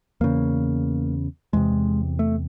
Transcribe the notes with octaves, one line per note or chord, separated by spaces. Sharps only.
E2 C#3 A#3
E2 C3 G#3
A3